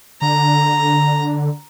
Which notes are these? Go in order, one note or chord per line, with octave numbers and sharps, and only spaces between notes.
D3 A#5